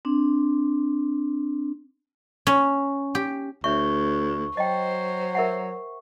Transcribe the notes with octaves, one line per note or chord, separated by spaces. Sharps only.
C4 D4
C#4
G4
D2 C#5 E5 C#6
F#3 C5 D#5 G5
A#4 E5 F#5